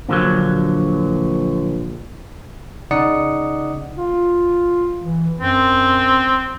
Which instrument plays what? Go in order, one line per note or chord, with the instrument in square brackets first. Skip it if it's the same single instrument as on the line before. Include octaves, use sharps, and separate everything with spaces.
[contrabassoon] A#1 [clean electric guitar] A#2 D3 F#3
[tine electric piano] C#3 D#4 D5 F#5 D#6 C#7
[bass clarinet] F4
E3
[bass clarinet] F#2 [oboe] C4